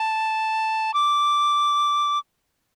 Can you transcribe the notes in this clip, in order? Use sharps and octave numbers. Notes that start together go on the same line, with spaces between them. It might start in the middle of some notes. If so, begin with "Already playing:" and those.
Already playing: A5
D6